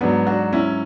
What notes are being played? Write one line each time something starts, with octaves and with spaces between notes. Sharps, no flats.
G#2 F#3 B3 D4
D4 F#4
C#4 E4